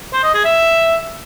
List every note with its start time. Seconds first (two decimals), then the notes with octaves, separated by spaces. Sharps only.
0.13 C5
0.24 D#5
0.34 G#4
0.45 E5